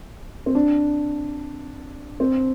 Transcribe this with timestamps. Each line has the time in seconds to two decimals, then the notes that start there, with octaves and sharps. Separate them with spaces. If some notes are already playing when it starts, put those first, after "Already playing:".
0.46 C4
0.55 D4
2.20 C4